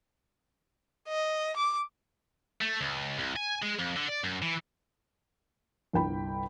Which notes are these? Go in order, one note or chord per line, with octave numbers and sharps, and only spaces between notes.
D#5
D6
A3
C#2
C2
G#5
G#3
F2
D3
D5
F#2
E3
G1 C2 G5 B5